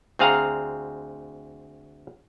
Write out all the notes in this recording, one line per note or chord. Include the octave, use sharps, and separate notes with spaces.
D2 C4 G#4 F5 F#5 A#5